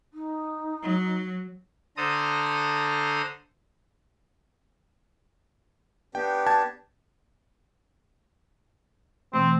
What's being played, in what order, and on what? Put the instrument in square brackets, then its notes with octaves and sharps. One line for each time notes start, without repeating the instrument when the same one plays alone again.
[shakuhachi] D#4
[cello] F#3
[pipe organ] D3 A4 C5 A#5 D#6
[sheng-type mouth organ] B3 D4 G4 [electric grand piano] G5
[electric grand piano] A5 G#6
[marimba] B2 E3 A3 [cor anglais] C4